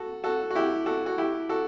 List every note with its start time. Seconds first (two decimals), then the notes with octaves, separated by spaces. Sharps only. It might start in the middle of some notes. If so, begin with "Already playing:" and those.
Already playing: F#4 A4
0.24 F#4 A4
0.51 F#4
0.55 E4 G4
0.86 F#4 A4
1.06 F#4
1.18 E4 G4
1.49 F#4 A4